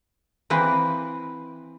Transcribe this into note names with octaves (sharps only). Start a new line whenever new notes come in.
E3 A#3 C4 B4